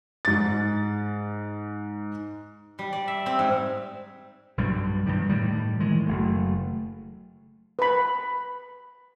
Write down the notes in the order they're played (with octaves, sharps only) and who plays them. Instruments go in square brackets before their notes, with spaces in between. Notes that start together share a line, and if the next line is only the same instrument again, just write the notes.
[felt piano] G#2 A6
[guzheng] G3
D5
E5
C4
G#2
[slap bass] B1 G2 G3
G2 D#3 G3
A2 D#3 G3
D#3 E3 G#3
F#1 A3
[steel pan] B4 B5